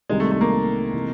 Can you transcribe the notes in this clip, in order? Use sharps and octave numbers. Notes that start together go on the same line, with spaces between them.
C2 C3 D#3 G3 G#3
A3
A3
A#3
C3 E3